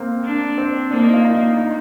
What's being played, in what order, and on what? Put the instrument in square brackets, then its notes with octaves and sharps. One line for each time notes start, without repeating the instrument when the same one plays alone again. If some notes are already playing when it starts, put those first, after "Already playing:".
Already playing: [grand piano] A#3 C4
[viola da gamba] D4
[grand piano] C4
[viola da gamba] A#3 [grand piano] D4
[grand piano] D#4
F4
D#4
D#4